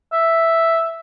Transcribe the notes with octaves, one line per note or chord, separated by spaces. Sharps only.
E5